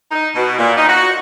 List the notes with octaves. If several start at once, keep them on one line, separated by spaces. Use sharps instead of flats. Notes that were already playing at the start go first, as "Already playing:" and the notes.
D#4
B2
A#2
D#4
F#4